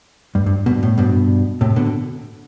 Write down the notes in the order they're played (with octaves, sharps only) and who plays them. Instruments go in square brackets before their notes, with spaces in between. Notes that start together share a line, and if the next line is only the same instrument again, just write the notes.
[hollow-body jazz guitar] G2
G2
G2 B2
A2
G2 B2
A2 C3
B2 D3